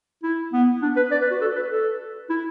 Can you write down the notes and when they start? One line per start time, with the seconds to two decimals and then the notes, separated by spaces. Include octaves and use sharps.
0.23 E4
0.53 B3
0.82 D4
0.96 B4
1.11 D5
1.22 B4
1.31 F#4
1.41 A4
1.56 B4
1.71 A4
2.30 E4